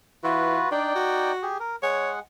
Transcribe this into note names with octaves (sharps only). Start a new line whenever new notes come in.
E3 F4 F#4 B4
D4 D#4 D5 G5
F#4
G4 G#4
A#4
G#3 G#4 C#5 F#5